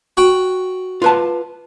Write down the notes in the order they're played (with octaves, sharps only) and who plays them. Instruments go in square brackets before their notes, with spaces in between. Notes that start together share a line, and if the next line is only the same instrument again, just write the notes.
[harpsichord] F#4 G5 C#6
[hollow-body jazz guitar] F4 B4 A5